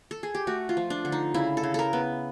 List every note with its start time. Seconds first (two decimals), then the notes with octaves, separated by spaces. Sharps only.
0.11 A4
0.23 G#4
0.35 G4
0.47 A3 F#4
0.69 F4
0.77 F3
0.90 D4
1.05 D3
1.12 D#4
1.34 C#3 E4
1.57 A4
1.63 C#3
1.74 A4 A#4
1.93 B3